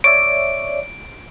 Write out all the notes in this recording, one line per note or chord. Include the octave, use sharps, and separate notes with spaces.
C#5 D5 E5 D7